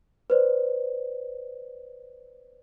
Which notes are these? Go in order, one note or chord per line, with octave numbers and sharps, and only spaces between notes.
B4 C5 D5